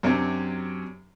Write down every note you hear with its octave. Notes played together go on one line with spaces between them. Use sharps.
F#2 C3 F#3 C4 D4